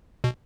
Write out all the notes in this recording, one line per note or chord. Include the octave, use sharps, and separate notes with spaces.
B2